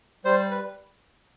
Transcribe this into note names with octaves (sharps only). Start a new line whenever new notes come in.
G3 C5
B4